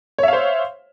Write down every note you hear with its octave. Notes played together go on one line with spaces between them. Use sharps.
C5 C#5 E5 F5